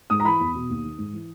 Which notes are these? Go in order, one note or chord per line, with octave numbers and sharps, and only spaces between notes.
G#2 D#6
A#5
E3 B5
E2
B2
D#2
D#3
G#2
E3